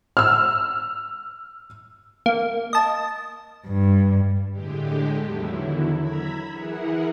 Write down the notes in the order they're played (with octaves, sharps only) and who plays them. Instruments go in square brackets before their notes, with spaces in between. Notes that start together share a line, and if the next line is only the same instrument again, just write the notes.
[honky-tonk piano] E6 F6
[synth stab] A#3
D#5 A5
[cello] G2
[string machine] A2 D3 G#3 G4
E2 D3 D#3 F#3 E4
A#5 B5 E6 G#6 B6
E3 E4 G#4 A#4 F#5